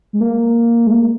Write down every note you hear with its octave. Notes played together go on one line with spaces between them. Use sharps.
G#3
A#3
G#3
A#3